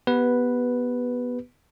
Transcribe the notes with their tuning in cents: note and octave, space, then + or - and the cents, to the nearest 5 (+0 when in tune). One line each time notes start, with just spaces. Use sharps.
B3 -10 G4 +0 B4 +0